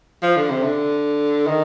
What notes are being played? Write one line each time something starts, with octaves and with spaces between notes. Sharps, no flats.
F3
D3
C3
D3
D#3